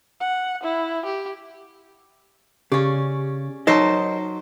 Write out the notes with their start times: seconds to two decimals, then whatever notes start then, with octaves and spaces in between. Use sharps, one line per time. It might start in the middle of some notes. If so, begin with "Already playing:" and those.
0.20 F#5
0.63 E4
1.05 G4
2.72 C#3 C#4 G4 D5
3.67 F#3 D#4 A#4 C5 C#5 D#5 A5 E6